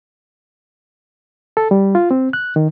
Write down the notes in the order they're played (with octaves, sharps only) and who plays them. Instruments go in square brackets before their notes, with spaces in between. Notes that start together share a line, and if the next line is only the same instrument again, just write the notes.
[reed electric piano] A4
G3
F4
C4
F#6
D#3